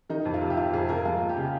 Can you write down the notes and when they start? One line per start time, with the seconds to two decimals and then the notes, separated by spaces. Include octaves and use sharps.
0.10 D#3 D#4
0.25 F2
0.34 F4
0.42 C3
0.50 G4
0.57 C3 F4
0.73 F2 G#4
0.89 F2 A#4
1.05 G#3 F4
1.21 D#2
1.29 G4
1.37 C#3